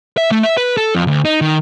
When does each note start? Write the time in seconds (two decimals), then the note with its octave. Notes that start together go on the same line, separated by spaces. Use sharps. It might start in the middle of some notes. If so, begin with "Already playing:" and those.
0.17 E5
0.31 A3
0.43 E5
0.57 B4
0.77 A4
0.95 F2
1.07 D2
1.25 D#4
1.41 D#3